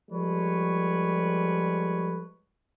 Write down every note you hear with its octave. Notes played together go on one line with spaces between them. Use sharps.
F3 G3 G#3 A4 B4 C#5